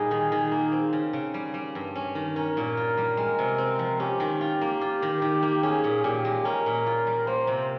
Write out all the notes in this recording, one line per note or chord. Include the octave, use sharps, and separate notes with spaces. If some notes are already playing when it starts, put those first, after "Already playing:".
Already playing: A#2 G3 D#4 F4 G#4
D#3
D#3
A#3
C4
C#3
C#3
G3
G3
G2
C#4
D#3
C#4 A#4
A#2
F4
G3
G#3
C3
C4
F3
C#4 G4
D#3
F4
A#3
F4
D#3
D#3
A#3
C#4 G#4
A#2
A#2 G4
G#3
C#4 A#4
A#2
F4
G3
A#3 C5
C3